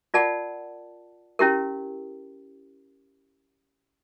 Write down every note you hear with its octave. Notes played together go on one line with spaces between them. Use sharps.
F4 A#4 D5 F#5 A5
C#4 E4 G4 A#4